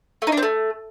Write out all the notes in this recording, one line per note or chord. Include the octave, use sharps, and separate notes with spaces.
A3
D#4
D4
C4
A3